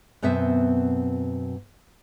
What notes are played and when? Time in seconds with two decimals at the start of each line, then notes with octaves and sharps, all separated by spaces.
0.22 F#2 B2 B3 C4 E5